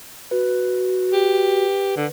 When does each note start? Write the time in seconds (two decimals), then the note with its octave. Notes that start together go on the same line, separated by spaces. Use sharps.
0.31 F#4 B4
1.13 G4
1.97 D3